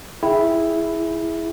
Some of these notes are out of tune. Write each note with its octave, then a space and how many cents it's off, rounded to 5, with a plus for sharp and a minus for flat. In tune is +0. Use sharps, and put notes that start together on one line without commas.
E4 +0 G#4 +0 G5 +0